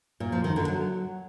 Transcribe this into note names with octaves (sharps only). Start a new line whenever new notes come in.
A#2
F3
D#3
D3
F#3